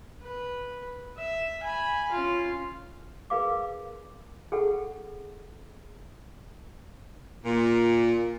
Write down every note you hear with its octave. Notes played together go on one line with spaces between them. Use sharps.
B4
E5
G#5 B5
C#4 F4
G#4 A#4 B4 F5 C6 D6
G#4 A4 F#5
A#2